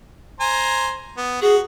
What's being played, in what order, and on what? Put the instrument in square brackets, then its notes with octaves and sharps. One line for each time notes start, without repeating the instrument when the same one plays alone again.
[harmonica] C5 G#5 A#5
B3
[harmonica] F#4 [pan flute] G#4